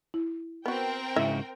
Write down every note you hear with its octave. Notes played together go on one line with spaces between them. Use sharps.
E4
B3 C4 F#4 A#4 G5
G#2 C#3 E4 F#4 D#5 E5